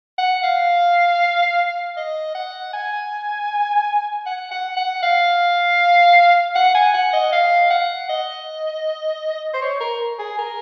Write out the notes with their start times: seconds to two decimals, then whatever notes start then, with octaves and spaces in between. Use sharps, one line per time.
0.18 F#5
0.43 F5
1.97 D#5
2.35 F#5
2.73 G#5
4.26 F#5
4.51 F#5
4.77 F#5
5.03 F5
6.56 F#5
6.75 G#5
6.94 F#5
7.13 D#5
7.32 F5
7.70 F#5
8.09 D#5
9.54 C5
9.62 C#5
9.81 A#4
10.19 G#4
10.38 A#4